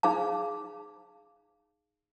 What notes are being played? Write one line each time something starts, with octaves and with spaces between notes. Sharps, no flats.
D#4 G#4 F5 A5